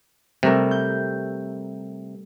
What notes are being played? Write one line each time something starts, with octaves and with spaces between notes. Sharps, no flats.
C3 G3 A3 A#4
G6